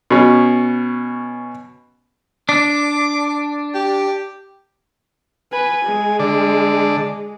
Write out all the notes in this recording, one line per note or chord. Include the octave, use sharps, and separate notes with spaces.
B2 C#4
D4 D6
G4
B4 G#5
G#3
D3 D5